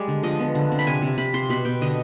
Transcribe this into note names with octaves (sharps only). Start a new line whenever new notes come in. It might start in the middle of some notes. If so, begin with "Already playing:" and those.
Already playing: G3 G#3 D5
D3
F3 D#5
B3
D3
C4
B5
C3 G#5
C3
C3 B5
C4 C6
B2 B5
B2 G5
D3 D#5